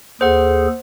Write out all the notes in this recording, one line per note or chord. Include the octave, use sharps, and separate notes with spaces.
D#2 G#4 A4 C5 F#5